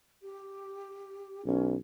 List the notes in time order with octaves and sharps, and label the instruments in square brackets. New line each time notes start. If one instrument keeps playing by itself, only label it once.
[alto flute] G4
[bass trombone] B1 [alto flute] C#4